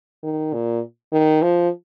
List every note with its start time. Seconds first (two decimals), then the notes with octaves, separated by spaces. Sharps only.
0.23 D#3
0.53 A#2
1.12 D#3
1.42 F3